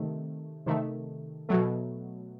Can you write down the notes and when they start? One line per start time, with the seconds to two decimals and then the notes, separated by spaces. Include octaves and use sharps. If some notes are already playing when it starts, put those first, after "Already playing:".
Already playing: C3 D#3 A3
0.66 C3 D#3 A3
1.49 B2 F#3 A3